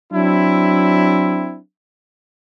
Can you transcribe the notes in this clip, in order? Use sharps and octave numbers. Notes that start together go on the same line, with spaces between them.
F#3 C4 D4 E4